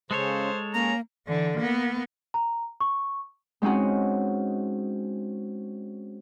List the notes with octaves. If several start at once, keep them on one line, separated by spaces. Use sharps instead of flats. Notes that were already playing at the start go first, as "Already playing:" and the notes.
C#3 G#3 A4 C5 C#5
A#3 C#4 A#5
D3 E3
A#3 B3
A#5
C#6
G#3 C4 C#4 D#4 F#4